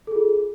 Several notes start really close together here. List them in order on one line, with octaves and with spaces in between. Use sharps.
A4 G#4 F4